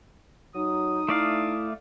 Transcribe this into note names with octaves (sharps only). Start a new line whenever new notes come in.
F#3 D#4 D#6
A3 E4 D5 F5